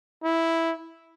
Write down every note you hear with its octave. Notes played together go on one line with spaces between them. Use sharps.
E4